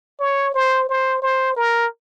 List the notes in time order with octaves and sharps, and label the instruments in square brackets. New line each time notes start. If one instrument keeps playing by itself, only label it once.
[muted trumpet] C#5
C5
C5
C5
A#4